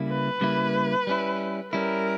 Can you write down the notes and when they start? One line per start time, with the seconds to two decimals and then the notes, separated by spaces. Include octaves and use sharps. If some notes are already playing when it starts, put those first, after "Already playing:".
Already playing: C#3 G3 A#3 E4
0.09 B4
0.41 C#3 G3 A#3 E4
1.07 G3 C#4 E4
1.72 G3 C#4 E4 A#4